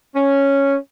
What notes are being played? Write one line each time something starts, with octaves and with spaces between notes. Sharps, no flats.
C#4